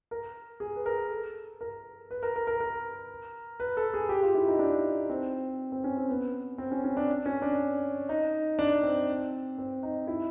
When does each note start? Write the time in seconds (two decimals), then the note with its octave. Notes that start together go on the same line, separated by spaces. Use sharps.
0.11 A#4
0.60 G#4
0.76 B4
0.86 A#4
1.11 A4
1.61 A#4
2.11 B4
2.23 A#4
2.36 A#4
2.47 A#4
2.60 A#4
3.60 B4
3.77 A4
3.94 G#4
4.09 G4
4.23 F4
4.35 E4
4.48 D#4
4.59 D4
5.10 C4
5.72 C4
5.84 C#4
5.97 C4
6.10 B3
6.58 C4
6.71 C#4
6.84 C#4
6.97 D4
7.26 C#4
7.42 D4
8.09 D#4
8.59 D4
8.83 C4
9.58 C4
9.83 D#4
10.07 E4